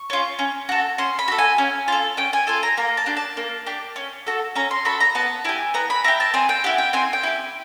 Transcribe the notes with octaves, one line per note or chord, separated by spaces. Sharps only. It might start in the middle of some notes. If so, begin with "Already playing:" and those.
Already playing: C#6
C#4 F4
C#4
F#4 A4
C#4 C6
B5
F#4 A4
G#5
C#4
F4 A4
C#4 G5
G#5
F4 A4 G#5
A#5
A#3 A#5
A5
D4 G4
A5
A#3
D4 G4
C#4
F#4 A4
C#4 A#5
C6
F#4 A4 B5
A#5
B3 A5
E4 G4 G#5
B3 A#5
B5
E4 G4 A#5
A5
C4 G#5
G5
E4 G4 F#5
G5
C4 G#5
G5
E4 G4